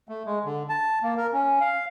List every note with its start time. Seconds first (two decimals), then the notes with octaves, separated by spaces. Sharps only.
0.09 A3
0.26 G#3
0.45 D3
0.69 A5
1.03 A#3
1.17 A#4
1.33 C#4
1.61 F5